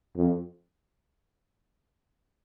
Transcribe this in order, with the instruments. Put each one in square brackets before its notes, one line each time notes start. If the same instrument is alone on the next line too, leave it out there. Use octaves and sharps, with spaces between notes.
[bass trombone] F2